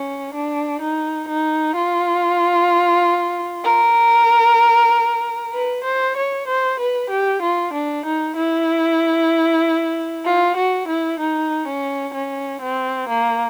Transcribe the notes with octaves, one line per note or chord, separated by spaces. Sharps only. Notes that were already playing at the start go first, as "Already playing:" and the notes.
Already playing: C#4
D4
D#4
D#4
F4
A#4
B4
C5
C#5
C5
B4
G4
F4
D4
D#4
E4
F4
F#4
E4
D#4
C#4
C#4
C4
A#3